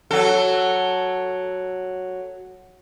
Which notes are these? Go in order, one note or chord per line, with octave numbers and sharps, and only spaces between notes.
F#3 A4